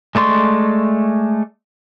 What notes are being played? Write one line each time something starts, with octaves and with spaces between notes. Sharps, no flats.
G#3 A3 D5 C6 C#6